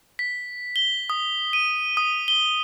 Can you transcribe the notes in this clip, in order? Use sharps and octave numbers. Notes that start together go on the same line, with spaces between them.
B6
G7
D#6
D#7
D#6
G7